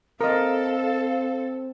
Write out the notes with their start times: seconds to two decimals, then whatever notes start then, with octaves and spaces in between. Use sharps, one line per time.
0.21 C4 A4 A#4 D#5 F5